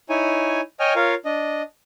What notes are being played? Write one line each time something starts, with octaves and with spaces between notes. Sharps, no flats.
D#4 E4 C#5 G#5
C#5 D#5 G5 G#5 F6
F4 A#4 C#5 F5
D4 D#5